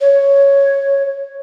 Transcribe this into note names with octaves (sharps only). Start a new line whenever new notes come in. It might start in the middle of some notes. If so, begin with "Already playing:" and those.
C#5